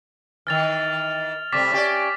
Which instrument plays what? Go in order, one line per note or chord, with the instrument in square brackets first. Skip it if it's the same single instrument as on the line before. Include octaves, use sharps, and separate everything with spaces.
[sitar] D#3 E3 [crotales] F6 A6 F7
[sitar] C3 G3 A3 [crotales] D6 A6 B6
[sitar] C#4 G4 D5